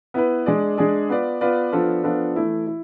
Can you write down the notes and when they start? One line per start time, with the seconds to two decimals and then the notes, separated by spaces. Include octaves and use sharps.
0.14 B3 E4 B4
0.46 G#3 D4 G#4 D5
0.77 G#3 D4 G#4 D5
1.09 B3 F4 B4 D5
1.41 B3 F4 B4 D5
1.72 F3 B3 D4 F4 A4
2.04 F3 B3 D4 F4 A4
2.36 E3 A3 E4
2.67 E4